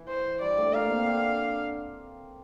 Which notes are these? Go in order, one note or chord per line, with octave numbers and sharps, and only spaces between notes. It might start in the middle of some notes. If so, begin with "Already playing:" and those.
Already playing: E3
C5
G2 G3 D5
A2 A3
A#2 A#3 F5
C3 C4
D3 D4